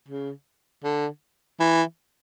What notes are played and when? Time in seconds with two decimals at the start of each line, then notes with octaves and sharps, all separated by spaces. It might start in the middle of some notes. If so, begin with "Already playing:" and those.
0.08 C#3
0.84 D3
1.60 E3